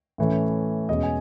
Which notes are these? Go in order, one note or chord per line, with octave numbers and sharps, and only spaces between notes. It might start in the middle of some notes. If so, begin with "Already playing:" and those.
A2 E3 A3 C#4
E2 B2 G#3 C#4 D#5
G#5